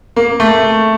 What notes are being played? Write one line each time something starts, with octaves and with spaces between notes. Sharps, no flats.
A#3
A3